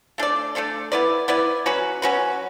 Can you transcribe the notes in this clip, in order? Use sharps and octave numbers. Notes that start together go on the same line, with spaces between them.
A3 D4 A4 D5
A3 D4 A4 D5
B3 E4 B4 D5
B3 E4 B4 D5
F#3 C#4 F#4 B4
F#3 C#4 F#4 B4